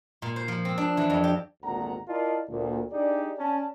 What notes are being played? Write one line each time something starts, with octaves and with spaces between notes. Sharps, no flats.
A#2
C5
F3
C4
D4
E3
F2
G4
G#1 D2 A#2 F#5 A#5
E4 F4 A#4 D5 D#5 A5
D2 A#2
D4 D#4 G4 G#4 D5
C#4 D5 A5